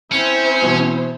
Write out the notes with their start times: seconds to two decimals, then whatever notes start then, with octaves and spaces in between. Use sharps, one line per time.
0.12 C4 C#4 E4 C5
0.62 B2 E3